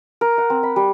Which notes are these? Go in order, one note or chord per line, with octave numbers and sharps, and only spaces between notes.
A#4
F#5
C4
B5
G3